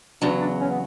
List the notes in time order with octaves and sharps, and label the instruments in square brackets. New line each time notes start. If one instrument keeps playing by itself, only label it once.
[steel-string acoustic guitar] E2 C#3 F#3 [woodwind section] D4
[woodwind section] D4
C#4
B3